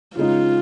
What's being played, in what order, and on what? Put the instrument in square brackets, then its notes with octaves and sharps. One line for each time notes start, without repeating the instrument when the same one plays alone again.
[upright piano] C#3 G#3 D#4 [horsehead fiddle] F4